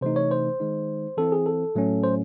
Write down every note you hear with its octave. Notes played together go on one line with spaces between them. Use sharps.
C3 E3 A3 D#4 C5
C#5
C5
D#3 G#3 D#4
E3 C4 E4 A4
G#4
A4
A2 F#3 A3 C#4
C5